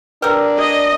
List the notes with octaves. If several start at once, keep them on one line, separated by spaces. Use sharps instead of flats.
D4 G4 A#4 B4 E6
D5 D#5